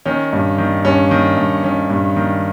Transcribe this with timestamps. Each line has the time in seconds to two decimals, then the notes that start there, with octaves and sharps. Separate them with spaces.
0.06 D#3 C#4
0.33 G2
0.58 D#3
0.85 G2 C#4
1.11 D#3
1.37 G2
1.63 D#3 C#4
1.90 G2
2.16 D#3